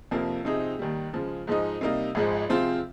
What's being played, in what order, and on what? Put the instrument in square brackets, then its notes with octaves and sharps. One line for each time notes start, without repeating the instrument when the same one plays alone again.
[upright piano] F2 C3 F3 A#3
C3 F3 C4 D#4 G#4
D#2 D#3 G3
C#3 F3 G#3
G#2 F3 G#3 D#4
C3 G3 A#3 D#4
G#1 G#2 F3 G#3
C3 F3 G#3 C4 F4